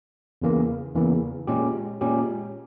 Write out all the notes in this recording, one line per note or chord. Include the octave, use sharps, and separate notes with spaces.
E2 C#3 E3 A#3
E2 C#3 E3 A#3
A#2 G#3 C#4 G4
A#2 G#3 C#4 G4